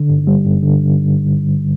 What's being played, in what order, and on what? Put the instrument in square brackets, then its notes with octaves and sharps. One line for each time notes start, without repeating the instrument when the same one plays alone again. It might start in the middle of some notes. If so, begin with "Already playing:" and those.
Already playing: [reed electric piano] D3
G2
G3
G2
D3